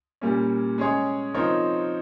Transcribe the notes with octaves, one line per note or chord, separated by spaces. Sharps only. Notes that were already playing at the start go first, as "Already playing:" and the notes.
A#2 G3 A#3 C#4
G#3 C#4 G#4 C#5
F3 C4 D#4 A#4 C#5